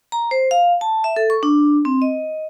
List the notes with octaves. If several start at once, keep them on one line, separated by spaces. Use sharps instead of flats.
A#5
C5
F5
A5
E5
A4
C#6
D4
C4
D#5